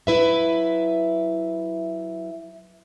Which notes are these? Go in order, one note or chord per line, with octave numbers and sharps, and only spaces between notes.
F#3 E4 B4 E5